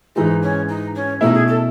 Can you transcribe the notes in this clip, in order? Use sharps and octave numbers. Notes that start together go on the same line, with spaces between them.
G#2 E3 G#3 D#4
C#4
D#4
C#4
B2 A3 C#4 D#4 E4
G#4
A4